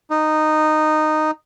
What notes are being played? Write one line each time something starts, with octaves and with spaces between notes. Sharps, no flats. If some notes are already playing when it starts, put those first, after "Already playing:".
D#4